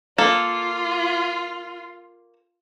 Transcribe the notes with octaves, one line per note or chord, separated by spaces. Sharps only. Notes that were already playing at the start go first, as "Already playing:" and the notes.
A#3 F4 A4